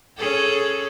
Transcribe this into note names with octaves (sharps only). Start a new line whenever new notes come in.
C#4 G#4 A4